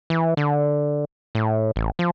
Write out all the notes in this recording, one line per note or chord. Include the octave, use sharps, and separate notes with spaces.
E3
D3
A2
A1
F3